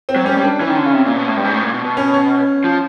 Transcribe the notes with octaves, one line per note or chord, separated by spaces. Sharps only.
C4
F#3
G3 C#4
G3
D4
E3 C#4
D#3
D3
C#3
C3
A#2
B2
A2
G2
G#2
A2
A#2
B2
B2
C#4
C#4
F3